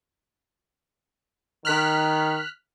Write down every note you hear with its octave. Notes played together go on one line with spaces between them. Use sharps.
D#3 F6 F#6 B6